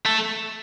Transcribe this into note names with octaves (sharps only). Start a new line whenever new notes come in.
A3